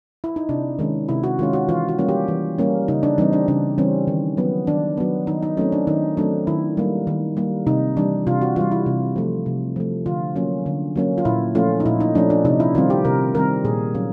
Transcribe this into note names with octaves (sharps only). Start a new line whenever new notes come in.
E4
D#4
C3 D4
D#3 G#3 C#4
C3 E4
F#4
D#3 G#3 C#4 F4
F#4
E3 F4
F#4
G3 A#3 C#4
G4
E3
G3 A#3 C#4
C#3 D#4
D4
E3 G3 C4 D#4
D4
C#3 D4
E3 G3 C4 C#4
D#3
F#3 B3
D#3 D4
F#3 B3
D#3 D#4
D#4
F#3 A3 C4 C#4
D4
D#3 D#4
F#3 A3 C4 D4
D#3 E4
G3 A#3
D#3
G3 A#3
C3 D#4
E3 G3 D4
C3 F4
F#4
E3 G3 F4
E4
C3
F3 A3
C3
F3 A3
D3 F4
F#3 A#3 C#4
D3
F#3 A#3 C#4
F4
A#2 E4
F3 A3 C#4 F4
D#4
A#2 E4
D#4
F3 A3 C#4 D4
D4
C3 D#4
E4
D#3 G3 C4 F4
G4
C3 A#4
D#3 G3 C4 A#4
A#2 G#4
F#3 A#3 C#4